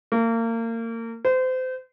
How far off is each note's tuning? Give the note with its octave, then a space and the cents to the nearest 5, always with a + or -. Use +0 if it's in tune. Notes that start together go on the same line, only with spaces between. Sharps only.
A#3 -30
C5 -30